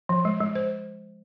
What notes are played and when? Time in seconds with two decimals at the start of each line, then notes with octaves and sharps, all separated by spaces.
0.09 F3
0.25 G#3
0.40 G#3
0.55 C5